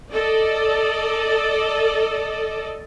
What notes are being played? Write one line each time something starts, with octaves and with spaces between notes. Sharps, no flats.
A4 D5 D#5